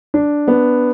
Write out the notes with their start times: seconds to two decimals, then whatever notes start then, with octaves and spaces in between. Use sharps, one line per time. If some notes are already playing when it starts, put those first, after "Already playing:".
0.14 D4
0.48 B3